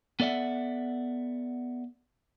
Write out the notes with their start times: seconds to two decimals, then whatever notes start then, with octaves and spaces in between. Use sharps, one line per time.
0.20 B3 A4 D5 E5 F#5